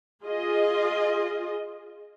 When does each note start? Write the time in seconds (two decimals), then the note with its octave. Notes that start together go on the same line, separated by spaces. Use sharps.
0.24 F4 G#4 D#5